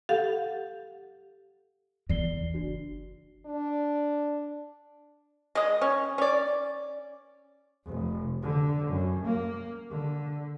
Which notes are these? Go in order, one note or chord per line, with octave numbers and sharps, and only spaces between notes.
G4 A4 F5 F#5
E2 E3 D5 C7 G7
F#1 D4 F#4
D4
G#3 D#5
C#4
C#4 D5
F1
D3
F#2
A#3
D3